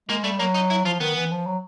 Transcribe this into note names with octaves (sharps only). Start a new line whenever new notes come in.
G#3 A#3
G3 A3
F#3 A#3
D#4
E4
F3 F4
D#3 B3
E3
F3
F#3